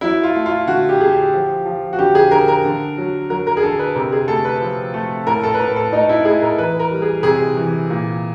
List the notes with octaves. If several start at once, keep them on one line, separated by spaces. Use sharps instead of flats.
F#3 E4
F4
A3
F4
D3 F#4
G4
D3 G#4
G4
F3
F3
F#4
D3 G4
G#4
D3 A#4
A#4
D3
F#3
F#3 A#4
A#4
G#4
D3 A4
B4
C3 A#4
G#4
A3 A4
B4
F3
A3
A2 A#4
A4
B4
A2 A#4
A4
A3 D#4
E4
A2 G#4
A#4
E3 B4
A#4
G3
G#4
C3 G#4
E3
A#2